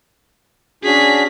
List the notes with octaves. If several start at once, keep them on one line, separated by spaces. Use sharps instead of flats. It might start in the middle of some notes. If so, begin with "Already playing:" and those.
C#4 D4 F#4 G#4 B6